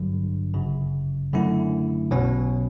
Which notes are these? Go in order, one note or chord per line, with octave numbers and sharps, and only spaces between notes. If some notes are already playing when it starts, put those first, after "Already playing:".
Already playing: A1 G2 D3 F#3
G1 F#2 C#3
F#2 D3 A3 E4
B1 B2 F#3 C#4